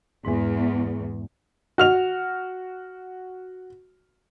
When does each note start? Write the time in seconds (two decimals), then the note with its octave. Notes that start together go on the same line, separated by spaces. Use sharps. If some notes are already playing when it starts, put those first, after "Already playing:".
0.25 E2 G#2 G#3
1.78 F#4 F6 F7